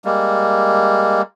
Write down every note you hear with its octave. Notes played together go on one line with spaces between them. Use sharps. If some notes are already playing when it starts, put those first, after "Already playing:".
G3 G#3 A#3